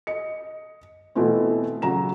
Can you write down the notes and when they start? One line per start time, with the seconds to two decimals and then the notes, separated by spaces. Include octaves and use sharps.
0.07 D#5 C#7
1.15 B2 E3 A3 C4
1.82 C#3 F#3 A#5 E7